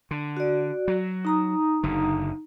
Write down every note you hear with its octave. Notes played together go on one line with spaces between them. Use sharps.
D3
F#4 D5
F#3
D#4 A#5 D#6
F#1 D3